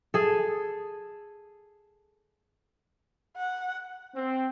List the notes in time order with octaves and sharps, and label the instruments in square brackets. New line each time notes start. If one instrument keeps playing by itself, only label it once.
[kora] G#4 A4
[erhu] F#5
[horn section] C4